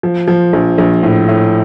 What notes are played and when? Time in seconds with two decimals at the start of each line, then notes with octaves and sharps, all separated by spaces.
0.03 F3
0.28 F3
0.53 A#1
0.78 A#1
1.03 A2
1.29 A2